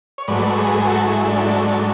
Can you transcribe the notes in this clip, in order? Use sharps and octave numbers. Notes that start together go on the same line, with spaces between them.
C#5
G#2 F#3 A3 B4 D5
G#4 B4
G#4
F#4 A4
E4 G#4
E4
D4
E4
D4
D4